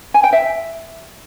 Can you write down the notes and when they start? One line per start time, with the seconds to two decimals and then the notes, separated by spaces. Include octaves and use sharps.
0.14 G#5
0.23 G5
0.33 E5